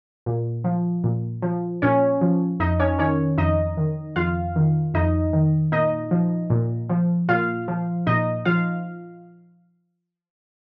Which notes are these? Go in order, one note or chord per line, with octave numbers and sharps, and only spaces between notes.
A#2
F3
A#2
F3
A#2 C#4 C#5
F3
F2 D#4 D#5
C#4 C#5
D#3 C#4 C#5
F2 D#4 D#5
D#3
F2 F4 F5
D#3
F2 D#4 D#5
D#3
A#2 D#4 D#5
F3
A#2
F3
A#2 F4 F5
F3
A#2 D#4 D#5
F3 F4 F5